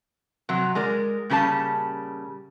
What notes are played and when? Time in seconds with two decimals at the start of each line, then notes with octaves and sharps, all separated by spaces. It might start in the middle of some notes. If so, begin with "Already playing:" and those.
0.49 C3 F#3
0.75 G#3 A#4 D5
1.30 A#2 C#3 G3 A4 A5